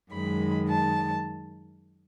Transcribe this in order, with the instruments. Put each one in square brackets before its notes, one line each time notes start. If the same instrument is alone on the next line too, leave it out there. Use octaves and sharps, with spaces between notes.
[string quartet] F#2 D#3 G#3 B5
A5